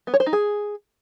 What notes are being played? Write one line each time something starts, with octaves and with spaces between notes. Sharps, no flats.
B3
C#5
C5
D#4
G#4